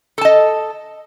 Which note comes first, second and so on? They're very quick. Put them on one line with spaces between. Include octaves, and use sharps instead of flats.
A4 A5 D#5